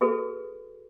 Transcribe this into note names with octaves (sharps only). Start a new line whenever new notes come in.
F#4 G#4 A4 B4